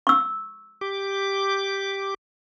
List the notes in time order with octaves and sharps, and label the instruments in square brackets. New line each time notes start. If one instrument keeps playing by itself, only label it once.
[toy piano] C#6 E6
[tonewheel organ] G4 D6